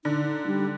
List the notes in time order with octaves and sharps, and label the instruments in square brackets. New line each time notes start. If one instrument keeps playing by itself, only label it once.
[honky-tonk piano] D3 [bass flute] D#4
[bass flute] D#4
G3